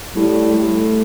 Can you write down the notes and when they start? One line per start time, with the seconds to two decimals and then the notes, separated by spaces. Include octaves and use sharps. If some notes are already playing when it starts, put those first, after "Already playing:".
0.16 A2 G3
0.54 A3